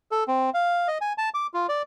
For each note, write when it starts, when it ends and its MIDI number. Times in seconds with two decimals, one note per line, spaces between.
0.11 0.24 69
0.28 0.50 60
0.54 0.88 77
0.88 0.98 75
1.01 1.13 80
1.18 1.29 81
1.34 1.47 86
1.54 1.67 65
1.69 1.82 74